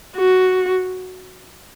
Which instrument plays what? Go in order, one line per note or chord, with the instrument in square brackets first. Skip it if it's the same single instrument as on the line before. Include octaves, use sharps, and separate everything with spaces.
[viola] F#4